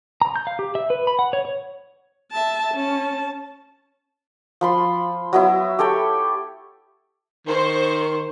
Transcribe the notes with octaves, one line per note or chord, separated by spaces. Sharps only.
A#5
G6
F5
G4
E5
B4
B5
F#5
C#5
C#5
E5 A5
C#4 A5
F3 B5 C6
F#3 B3 E4
G4 A4 C#5 G5
D#3 C5 C#6